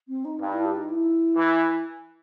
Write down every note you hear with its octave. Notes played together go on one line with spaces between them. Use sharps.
C4
D#4
G2 D#4
E4
G4
D#4
E4
E3